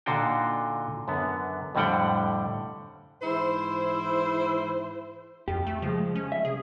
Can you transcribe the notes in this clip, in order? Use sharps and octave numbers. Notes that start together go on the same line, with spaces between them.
A#2 D3 D#4 F4 F#4 G5
F#2 D3 B3
F2 A2 D3 G3 F#5 G5
G#2 E3 E4 C5
F2 G4
A3
C#2 F3 G#3
C#4
E5
C2 G#4